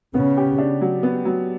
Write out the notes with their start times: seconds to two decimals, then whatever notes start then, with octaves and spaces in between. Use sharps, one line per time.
0.14 C#3 B3
0.37 G4
0.58 D4
0.81 F#3
1.03 B3
1.25 F#3